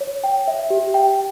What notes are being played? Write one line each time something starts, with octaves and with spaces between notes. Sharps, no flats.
C#5
G5
E5
G4
G5